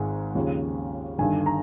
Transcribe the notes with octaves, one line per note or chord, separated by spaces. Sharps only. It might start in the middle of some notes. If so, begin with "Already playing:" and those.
Already playing: G#1 G#2 G#5
D#2 C#3 F3
G1 G2 D#3 G#5
A#5